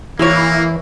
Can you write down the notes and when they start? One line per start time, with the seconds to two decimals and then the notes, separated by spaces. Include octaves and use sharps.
0.19 E3 G#3 A#3 E4 G4 C#5